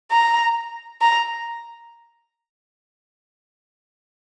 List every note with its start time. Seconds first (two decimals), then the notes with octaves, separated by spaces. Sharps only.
0.11 A#5
1.01 A#5